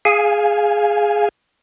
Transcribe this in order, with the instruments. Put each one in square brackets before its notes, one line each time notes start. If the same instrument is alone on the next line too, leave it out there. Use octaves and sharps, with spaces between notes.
[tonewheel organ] G#4 F5 G#5